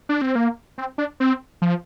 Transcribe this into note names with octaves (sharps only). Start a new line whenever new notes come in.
D4
C4
A#3
C4
D4
C4
F3